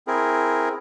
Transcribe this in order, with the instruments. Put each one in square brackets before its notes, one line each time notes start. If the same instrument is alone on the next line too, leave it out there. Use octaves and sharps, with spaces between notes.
[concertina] C4 E4 G#4 A#4